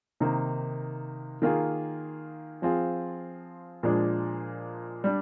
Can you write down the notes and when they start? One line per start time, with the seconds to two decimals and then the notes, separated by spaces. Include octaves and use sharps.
0.20 C3 D#3 A#3 D#4
1.42 D#3 A#3 F4 G#4
2.62 F3 C4 F4 G#4
3.83 A#2 F3 G#3 D4
5.04 G3 D4